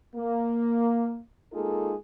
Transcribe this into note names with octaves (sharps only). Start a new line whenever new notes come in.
A#3
G#3 A#3 D#4 F4 G#4 A4